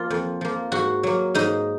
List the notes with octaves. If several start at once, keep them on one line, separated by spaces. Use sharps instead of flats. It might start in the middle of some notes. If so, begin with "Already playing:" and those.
Already playing: F3 A#3 F4
F2
F3 A#3
G#2 F#4
F#3 A#3
G#2 D#4